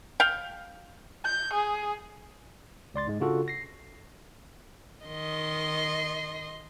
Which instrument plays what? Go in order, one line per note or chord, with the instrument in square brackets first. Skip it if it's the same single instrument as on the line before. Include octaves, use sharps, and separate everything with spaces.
[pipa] F5 G5
[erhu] G6
G#4
[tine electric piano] C#2 D5 C6 A6
G#2 G#3
C#3 D4 F4 F#4 A4
A#6 C7
[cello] D#3 [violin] D#5 C6